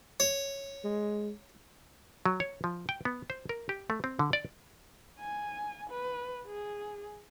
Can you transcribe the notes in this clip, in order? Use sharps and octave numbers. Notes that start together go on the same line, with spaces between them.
C#5
G#3
F#3
C#5
F3
G5
B3
C5
A#4
G4
A3
C4
D3
D5
G#5
B4
G#4